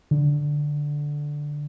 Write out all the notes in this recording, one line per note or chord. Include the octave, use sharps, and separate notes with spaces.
D3